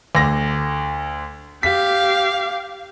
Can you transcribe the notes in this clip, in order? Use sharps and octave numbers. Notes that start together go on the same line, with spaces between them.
D2 A#6
G4 F5 B6